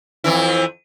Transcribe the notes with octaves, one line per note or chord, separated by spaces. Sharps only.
F2 E3 E4